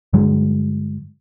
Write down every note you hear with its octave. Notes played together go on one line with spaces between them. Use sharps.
G2 D3 F#3 G#3